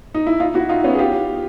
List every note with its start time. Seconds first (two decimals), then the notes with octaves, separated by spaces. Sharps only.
0.14 D#4
0.27 E4
0.40 D#4 F4
0.54 E4 F#4
0.69 D#4 F4
0.84 B3 C#4
0.95 G#4
0.99 F4 G4